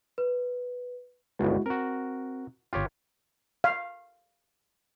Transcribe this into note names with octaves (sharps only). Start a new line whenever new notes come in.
B4
G1 C#2 G#3 E4 F#4
C4 F#4 A#4
G1 F4 G4 C#5 G5
F5